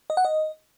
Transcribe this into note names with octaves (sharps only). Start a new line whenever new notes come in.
D#5
F#5
D#5